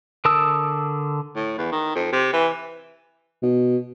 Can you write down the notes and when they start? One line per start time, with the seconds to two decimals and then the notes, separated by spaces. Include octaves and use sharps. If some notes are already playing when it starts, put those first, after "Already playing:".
0.25 D3 A#4 A5 D#6 E6
1.35 A2
1.58 E2
1.72 D#3
1.95 F2
2.12 C3
2.33 E3
3.42 B2